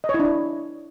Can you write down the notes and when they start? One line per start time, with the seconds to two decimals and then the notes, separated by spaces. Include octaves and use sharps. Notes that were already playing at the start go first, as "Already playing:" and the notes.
0.04 D#5
0.09 C#5
0.14 E4
0.19 D4
0.25 E4